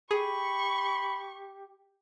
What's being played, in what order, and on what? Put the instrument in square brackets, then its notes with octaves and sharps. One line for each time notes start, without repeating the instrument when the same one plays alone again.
[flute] G4 [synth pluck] G#4 [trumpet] B5 [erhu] C#6